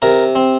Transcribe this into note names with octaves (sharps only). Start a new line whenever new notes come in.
C3 A#4
C4